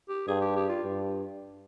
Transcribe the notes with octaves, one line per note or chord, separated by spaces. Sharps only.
G4
G2 G#4
G4
G4
F4
G2